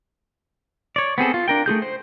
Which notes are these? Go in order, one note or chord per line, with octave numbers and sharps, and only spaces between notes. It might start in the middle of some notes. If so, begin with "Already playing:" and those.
C#5 D5
B3 C4 G#4 A4
F4
D4 A#4 G5
A3 F4 G#4 G6
C5